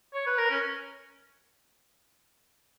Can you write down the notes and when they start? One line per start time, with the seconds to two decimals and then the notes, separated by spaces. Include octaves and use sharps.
0.14 C#5
0.26 B4
0.38 A#4
0.51 C#4